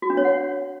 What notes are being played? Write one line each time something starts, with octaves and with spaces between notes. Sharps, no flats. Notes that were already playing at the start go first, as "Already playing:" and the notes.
F#4
D4
C#5
F#5